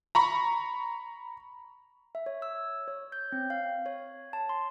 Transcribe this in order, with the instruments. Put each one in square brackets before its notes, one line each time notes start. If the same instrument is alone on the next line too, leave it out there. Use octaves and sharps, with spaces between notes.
[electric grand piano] A#5 B5 C#6
[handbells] E5
C#5
E6
C#5
G6
C4
F5
C#5
A5
C6